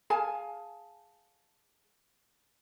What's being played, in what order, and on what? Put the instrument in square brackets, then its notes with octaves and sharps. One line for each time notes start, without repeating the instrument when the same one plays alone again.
[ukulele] G#4 F5 G#5 A5